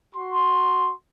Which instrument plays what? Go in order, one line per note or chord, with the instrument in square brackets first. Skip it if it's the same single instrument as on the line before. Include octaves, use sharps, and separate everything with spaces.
[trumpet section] F#4 C6